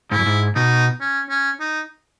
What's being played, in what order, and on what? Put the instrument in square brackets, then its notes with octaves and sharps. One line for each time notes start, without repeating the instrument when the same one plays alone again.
[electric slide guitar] G#2 [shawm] E4
[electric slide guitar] F#2
G#2
[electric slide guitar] B2 [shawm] D#4
[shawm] C#4
C#4
D#4